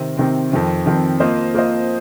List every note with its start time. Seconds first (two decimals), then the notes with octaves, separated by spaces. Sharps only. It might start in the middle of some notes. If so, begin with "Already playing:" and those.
Already playing: C3 D#3 C4
0.17 C3 D#3 C4
0.52 F2 D#3 C4
0.86 F2 D#3 C4
1.20 A#3 F4 C5 D#5
1.55 A#3 F4 C5 D#5